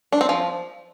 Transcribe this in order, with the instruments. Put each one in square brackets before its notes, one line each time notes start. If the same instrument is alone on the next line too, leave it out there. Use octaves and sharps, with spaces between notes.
[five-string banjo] D4
C4
F3